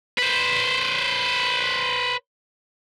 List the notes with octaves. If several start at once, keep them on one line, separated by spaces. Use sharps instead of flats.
B4 C5